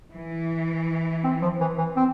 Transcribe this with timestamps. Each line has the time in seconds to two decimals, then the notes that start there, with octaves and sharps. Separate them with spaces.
0.13 E3
1.24 C4
1.42 F3
1.60 E3
1.78 E3
1.96 C4